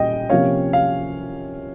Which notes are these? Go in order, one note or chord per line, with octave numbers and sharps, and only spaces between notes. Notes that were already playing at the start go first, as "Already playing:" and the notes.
Already playing: A#2 G3 C#4 D#5 G5
C3 F3 A#3 C#4 C#5 F5
F5